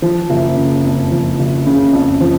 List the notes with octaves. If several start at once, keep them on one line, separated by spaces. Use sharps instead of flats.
F3
F#1
C#3
F2
F3
F#1
C#3
F2
F3